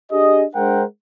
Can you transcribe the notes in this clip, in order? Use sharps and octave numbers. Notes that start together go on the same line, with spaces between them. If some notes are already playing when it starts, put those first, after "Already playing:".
D4 G4 G#4 D#5
G#3 D4 A#4 C5 F#5 G5